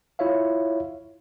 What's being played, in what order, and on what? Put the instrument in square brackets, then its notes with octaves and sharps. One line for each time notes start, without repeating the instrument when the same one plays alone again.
[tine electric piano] E4 F4 C#5 E5 F5